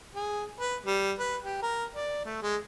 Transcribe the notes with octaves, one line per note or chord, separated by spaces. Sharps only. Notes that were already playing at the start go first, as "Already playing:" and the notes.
G#4
B4
G3
B4
G4
A#4
D5
A3
G#3